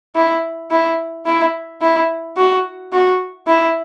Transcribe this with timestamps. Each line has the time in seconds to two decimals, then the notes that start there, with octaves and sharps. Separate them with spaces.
0.16 E4
0.71 E4
1.26 E4
1.81 E4
2.37 F#4
2.93 F#4
3.47 E4